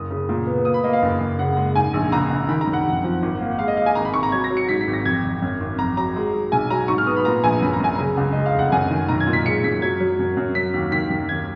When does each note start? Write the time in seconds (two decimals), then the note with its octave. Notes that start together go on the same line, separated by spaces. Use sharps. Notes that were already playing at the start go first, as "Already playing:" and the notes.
Already playing: F#1 D#6
0.11 C#3
0.29 A#2
0.47 B3
0.65 A#3 D#6
0.74 B5
0.84 A#3 D#5
0.93 F5
1.02 F#1
1.20 F#1
1.39 C#3 F#5
1.57 G#3
1.75 G#2 G#5
1.94 A#1
2.12 C#2 A#5
2.30 C#2
2.49 D#3 B5
2.61 A#5
2.67 F#2
2.73 F#5
2.86 F2
3.04 F3
3.22 G#1
3.41 A#3
3.59 G#3 F5
3.68 D#5
3.77 G#3 F5
3.86 G#5
3.95 G#1 A#5
4.05 B5
4.14 G#1 C#6
4.23 A#5
4.32 F#3 G#6
4.44 A#6
4.50 F#3
4.57 C#7
4.69 G#2 B6
4.81 B6
4.87 G#1
4.93 A#6
5.05 F2 G#6
5.24 F2
5.42 F#2
5.60 G#1
5.78 F2 A#5
5.97 F#3 A#5
6.16 G#3
6.34 G#3
6.52 B1 G#5
6.70 F#3 A#5
6.88 G#2 C#6
6.98 F6
7.07 B3 D#6
7.16 B5
7.25 A#2 A#5
7.43 A#1 G#5
7.62 F#2 B5
7.73 A#5
7.80 F#2 G#5
7.95 C#3 A#5
8.17 C#2
8.32 G#3 D#5
8.46 F5
8.54 F1 F#5
8.72 F#2 G#5
8.90 D#3
9.09 B1 A#5
9.20 G#6
9.27 A#2
9.33 B6
9.46 G#3 C#7
9.64 F#2 B6
9.82 F#3 G#6
10.00 F#3
10.19 F#2
10.37 F#2
10.55 F#3 B6
10.74 D#2
10.92 D#3 B6
11.10 F#2
11.29 D#2 G#6